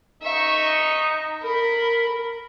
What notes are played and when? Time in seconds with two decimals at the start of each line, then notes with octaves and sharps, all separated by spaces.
0.22 D#4 E5 C#6
1.42 A#4 B5